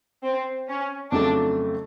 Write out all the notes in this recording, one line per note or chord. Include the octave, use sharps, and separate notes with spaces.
C4
C#4
F2 C#3 F#3 A3 D4